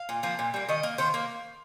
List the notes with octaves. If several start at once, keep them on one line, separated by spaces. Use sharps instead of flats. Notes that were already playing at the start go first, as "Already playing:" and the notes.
Already playing: F5
A#2
F3 A#3
A#2
G3 A#3
D#3 D#5
A#3
D#3 C5
A#3